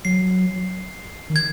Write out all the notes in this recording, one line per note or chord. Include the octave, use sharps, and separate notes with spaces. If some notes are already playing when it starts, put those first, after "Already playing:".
F#3 C7
D#3
G#6